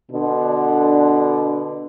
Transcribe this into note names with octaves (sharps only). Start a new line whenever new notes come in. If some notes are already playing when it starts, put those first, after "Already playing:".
B2 D3 D4